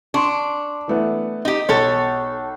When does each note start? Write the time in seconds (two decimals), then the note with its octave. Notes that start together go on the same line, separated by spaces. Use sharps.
0.14 D4 C6 C#6
0.88 E3 A3 B3
1.45 D#4 G4
1.69 B1 A4 C#5